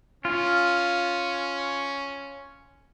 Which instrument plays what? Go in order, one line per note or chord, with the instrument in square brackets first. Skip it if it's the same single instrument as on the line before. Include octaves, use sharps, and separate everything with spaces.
[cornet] C#4 [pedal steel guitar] F4